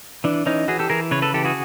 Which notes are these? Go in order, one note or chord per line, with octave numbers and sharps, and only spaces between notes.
E3 D4
E3 C#4 D#4
E3 F#4 G#4
G4 A4
E3 G#4 A#4
C#3 B4 C#5
A4 B4
E3 G4 A4
F#4 G#4